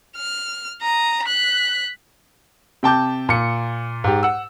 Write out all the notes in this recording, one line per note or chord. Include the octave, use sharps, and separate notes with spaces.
F6
A#5 D#6
F#6 B6
C3 G5 A5 D6 G6
A#2 C#7
G#2 G4
F#5 E6